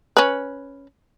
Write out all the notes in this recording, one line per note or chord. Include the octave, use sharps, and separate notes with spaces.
C#4 B4